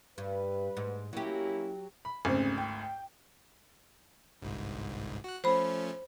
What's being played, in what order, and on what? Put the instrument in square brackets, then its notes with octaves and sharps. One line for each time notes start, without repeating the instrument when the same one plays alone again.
[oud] G2 [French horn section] B4
[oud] G#2
[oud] F#3 G4 [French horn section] A#3 C#4 E4
[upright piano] B5
[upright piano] G#1 D2 [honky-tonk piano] C#3 C4
[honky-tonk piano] G5
[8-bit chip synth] G1 C2 G#2
F#4 F#6
[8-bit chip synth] F3 A3 C#4 [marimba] C5 B5